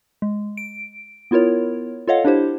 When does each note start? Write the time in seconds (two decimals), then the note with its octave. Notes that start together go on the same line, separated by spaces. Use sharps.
0.22 G#3
0.57 D7
1.31 B3 E4 F4 A#4 C#5
2.08 F4 A4 C#5 D#5 F5 F#5
2.25 D4 E4 G4 C5